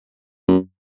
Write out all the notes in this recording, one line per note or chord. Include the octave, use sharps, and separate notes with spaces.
F#2